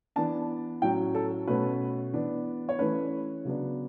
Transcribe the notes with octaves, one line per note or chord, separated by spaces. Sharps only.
E3 B3 D4 A5
A2 F#3 C#4 G5
A4
B2 A3 C#4 B4
E3 B3 D4
C#5
E3 A3 C#4 B4
C#3 F#3 B3 D4